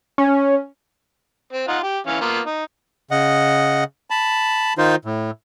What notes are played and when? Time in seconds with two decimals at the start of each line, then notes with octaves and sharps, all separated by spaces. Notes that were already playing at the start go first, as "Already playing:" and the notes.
0.18 C#4
1.53 C4
1.68 D#4 F4 F#5
1.83 G4
2.07 E3 C#4 F5
2.21 A#3 B3 F4
2.46 D#4
3.11 C#3 D#5 F#5
4.10 A5 B5
4.78 D#3 D#4 F4 C5
5.05 A2